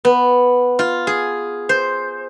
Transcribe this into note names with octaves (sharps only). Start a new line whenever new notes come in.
B3
F4
G#4
C5